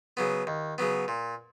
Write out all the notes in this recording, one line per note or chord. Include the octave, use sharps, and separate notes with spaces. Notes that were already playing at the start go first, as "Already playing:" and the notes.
C#3 F#3 B3
D#2
C#3 F#3 B3
A#2